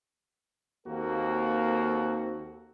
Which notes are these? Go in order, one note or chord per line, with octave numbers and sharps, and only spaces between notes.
D#2 A#3 C4 F#4 A4